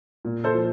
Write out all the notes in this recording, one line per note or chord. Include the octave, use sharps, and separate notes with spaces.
A#2
A4 C5
F3